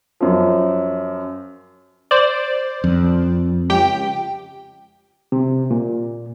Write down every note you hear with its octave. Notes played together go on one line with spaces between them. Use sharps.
F#2 F3
C5 D5
F2
C#2 G4 G5
C3
A#2